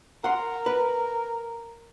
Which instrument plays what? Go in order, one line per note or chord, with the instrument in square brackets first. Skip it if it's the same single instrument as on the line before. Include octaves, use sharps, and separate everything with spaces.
[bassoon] A#4 [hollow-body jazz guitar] F#5 C6
[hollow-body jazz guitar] B4